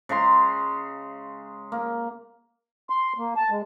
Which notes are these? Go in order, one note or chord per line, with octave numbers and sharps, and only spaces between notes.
C#3 G#3 A#5 C6
A#3
C6
A#3
A5
G#3